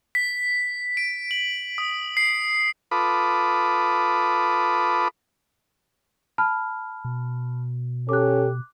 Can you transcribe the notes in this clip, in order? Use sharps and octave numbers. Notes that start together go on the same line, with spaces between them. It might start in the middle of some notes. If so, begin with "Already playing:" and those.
B6
D7
F#7
D#6
C7
F4 A4 B4 B5 D6 D#6
A5 B5 F6
B2
C#4 G4 A4 D6 F#6